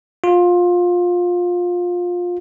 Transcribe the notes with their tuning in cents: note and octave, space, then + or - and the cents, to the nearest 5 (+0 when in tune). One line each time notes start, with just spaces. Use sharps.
F4 +20